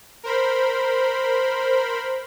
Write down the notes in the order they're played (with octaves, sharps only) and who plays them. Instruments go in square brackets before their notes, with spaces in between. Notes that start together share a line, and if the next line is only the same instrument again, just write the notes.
[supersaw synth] A#4 C5 B5